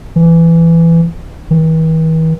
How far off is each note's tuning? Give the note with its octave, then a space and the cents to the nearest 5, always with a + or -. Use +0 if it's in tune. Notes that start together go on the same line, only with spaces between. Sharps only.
E3 +15
E3 -45